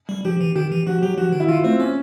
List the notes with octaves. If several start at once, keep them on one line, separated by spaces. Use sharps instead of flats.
G3
F3 G4
E3
D#3 G4
E3
F3 F#4
F#3 G4
F3 F#4
D#3
E4
D#3 F4
A3 C4
A#3 C#4